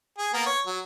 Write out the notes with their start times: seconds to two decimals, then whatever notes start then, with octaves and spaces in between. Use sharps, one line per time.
0.18 G#4
0.34 A#3 B3 A#4
0.46 C#5
0.66 F#3